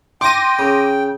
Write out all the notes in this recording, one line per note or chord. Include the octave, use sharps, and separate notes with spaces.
G5 C6 D6 A#6 D#7
C#3